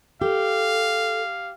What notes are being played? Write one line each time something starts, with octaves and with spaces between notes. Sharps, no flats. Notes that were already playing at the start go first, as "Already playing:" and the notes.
G4 A4 F5